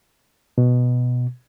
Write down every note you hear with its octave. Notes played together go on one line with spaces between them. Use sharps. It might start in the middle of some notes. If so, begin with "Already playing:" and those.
B2